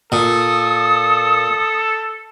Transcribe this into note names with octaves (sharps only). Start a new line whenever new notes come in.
A#2 A4 D#6